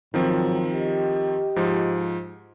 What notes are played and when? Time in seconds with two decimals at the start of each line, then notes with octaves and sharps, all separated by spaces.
0.14 G#2 D#3 F3 F#3 C4
0.74 G4 D#5
1.56 G#2 F3